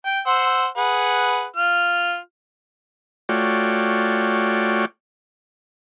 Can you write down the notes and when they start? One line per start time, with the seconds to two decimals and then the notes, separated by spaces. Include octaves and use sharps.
0.06 G5
0.27 C5 F#5 E6
0.77 G#4 B4 F#5
1.56 F4 F6
3.29 A3 F4 F#4 C#5 D5 G5